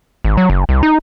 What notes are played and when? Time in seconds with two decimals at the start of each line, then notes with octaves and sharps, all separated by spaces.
0.25 G#1
0.37 F#3
0.50 F#1
0.69 C2
0.83 D#4